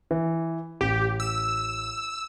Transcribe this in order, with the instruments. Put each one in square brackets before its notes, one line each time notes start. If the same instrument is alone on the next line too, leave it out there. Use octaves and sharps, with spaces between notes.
[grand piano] E3
[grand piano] A1 [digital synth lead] G4
[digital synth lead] E6